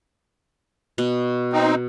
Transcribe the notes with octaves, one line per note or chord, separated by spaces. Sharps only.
B2
C4 D#4